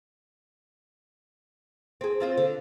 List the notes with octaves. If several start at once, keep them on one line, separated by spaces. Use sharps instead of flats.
C4 G#4
C4 F4 C5
D3